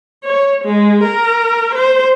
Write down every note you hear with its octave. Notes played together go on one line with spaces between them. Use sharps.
C#5
G#3
A#4
C5